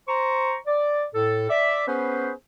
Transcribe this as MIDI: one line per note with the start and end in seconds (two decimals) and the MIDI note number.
0.08 0.56 72
0.08 0.56 82
0.08 0.56 85
0.67 1.05 74
1.15 1.47 45
1.15 1.47 69
1.50 1.86 74
1.50 1.86 76
1.88 2.32 59
1.88 2.32 61
1.88 2.32 68
1.88 2.32 71
1.88 2.32 72